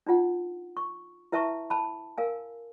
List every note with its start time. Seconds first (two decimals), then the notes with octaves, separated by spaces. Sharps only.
0.07 D4 D#4 F4 F#5
0.77 C#6
1.32 E4 B4 E5 A5 A#5 C#6
1.70 A5 B5
2.18 A#4 F5 G#5